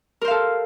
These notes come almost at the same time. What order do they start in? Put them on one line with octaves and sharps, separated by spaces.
A#4 C5 F5 A4